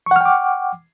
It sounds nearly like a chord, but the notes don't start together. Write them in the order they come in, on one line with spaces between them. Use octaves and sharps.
C#6 F#5 F6 G5 D6